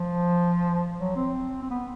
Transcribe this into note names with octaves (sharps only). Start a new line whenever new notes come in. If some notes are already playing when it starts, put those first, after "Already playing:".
Already playing: F3
F#3
C4
C4
B3